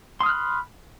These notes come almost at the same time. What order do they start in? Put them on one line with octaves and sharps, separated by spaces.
C6 D#6 F6 F#6 B5